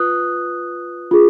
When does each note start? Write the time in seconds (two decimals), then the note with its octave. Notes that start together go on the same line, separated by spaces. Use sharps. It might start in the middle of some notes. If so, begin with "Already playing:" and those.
Already playing: F4 B4 D#6 F#6
1.11 F4 G#4